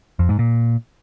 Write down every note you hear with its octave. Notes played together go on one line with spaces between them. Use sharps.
F2
G#2
A#2